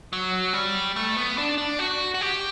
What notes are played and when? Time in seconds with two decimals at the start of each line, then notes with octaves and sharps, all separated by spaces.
0.13 F#3
0.53 G3
0.96 A3
1.17 B3
1.38 D4
1.58 D4
1.79 F#4
2.14 F#4
2.21 G4